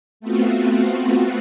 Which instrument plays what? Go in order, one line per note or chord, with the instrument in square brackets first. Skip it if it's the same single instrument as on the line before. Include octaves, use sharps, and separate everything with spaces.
[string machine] A3 B3 C4 F4 F#4